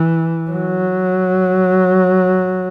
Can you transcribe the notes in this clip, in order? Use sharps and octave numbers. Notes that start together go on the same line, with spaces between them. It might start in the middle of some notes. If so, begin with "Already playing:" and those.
Already playing: E3
F#3